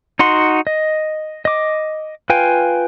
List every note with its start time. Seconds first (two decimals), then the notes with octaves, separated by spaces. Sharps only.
0.19 D#4 F#4 F#5 C6
0.67 D#5
1.45 D#5 D6
2.30 F4 B4 F5 G5 G#5